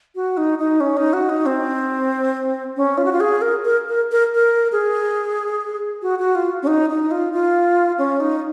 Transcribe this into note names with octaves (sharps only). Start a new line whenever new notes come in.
F#4
D#4
D#4
C#4
D#4
F#4
D#4
C4
C#4
F4
F#4
F4
G#4
A#4
A#4
A#4
A#4
A#4
G#4
F#4
F#4
F4
C#4
D#4
D#4
F4
F4
C#4
D#4